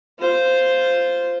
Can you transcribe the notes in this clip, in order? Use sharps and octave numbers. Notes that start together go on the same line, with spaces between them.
F4 C5